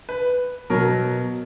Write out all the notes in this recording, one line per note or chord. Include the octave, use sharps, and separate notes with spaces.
B4
B2 F#3 A#4